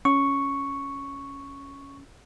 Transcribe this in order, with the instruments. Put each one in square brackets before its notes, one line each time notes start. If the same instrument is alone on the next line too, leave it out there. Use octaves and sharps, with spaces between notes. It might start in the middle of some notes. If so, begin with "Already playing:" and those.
[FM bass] C#4 [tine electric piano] C#6